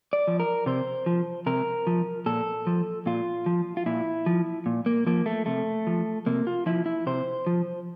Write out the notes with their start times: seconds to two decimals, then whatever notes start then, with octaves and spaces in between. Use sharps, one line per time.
0.13 D5
0.27 F3
0.40 A#4
0.66 C3 C5
1.06 F3
1.46 C3 A#4
1.87 F3
2.26 A#2 A4
2.67 F3
3.06 A#2 F4
3.46 F3
3.77 F4
3.86 A#2 E4
4.26 F3
4.66 A#2
4.86 A#3
5.06 F3 A#3
5.26 A3
5.46 C3 A3
5.87 F3
6.26 C3 A#3
6.47 F4
6.66 F3 E4
6.86 E4
7.07 C3 C5
7.47 F3